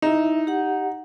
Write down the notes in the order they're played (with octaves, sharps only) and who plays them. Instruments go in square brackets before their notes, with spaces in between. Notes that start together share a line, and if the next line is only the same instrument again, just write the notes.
[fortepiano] D#4 [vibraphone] E4 E5
[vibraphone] G4 F#5